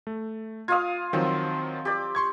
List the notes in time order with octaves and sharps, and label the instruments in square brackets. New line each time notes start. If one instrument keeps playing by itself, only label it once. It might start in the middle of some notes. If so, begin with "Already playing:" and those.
[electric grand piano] A3
[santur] F4 F5 D#6 [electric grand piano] G#6
[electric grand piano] D#3 F3 F#3 [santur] C4
[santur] G4 D5
[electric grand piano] C6 C#6 G#6